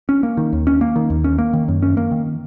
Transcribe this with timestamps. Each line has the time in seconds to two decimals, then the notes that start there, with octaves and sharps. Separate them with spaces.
0.09 C#4
0.23 A#3
0.37 D#3
0.53 D#2
0.67 C#4
0.81 A#3
0.96 D#3
1.10 D#2
1.24 C#4
1.38 A#3
1.53 D#3
1.68 F#2
1.82 C#4
1.97 A#3
2.11 D#3